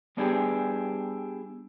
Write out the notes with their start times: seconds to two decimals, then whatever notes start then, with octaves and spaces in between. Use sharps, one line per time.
0.17 G3 B3 D4 E4 G4 G#4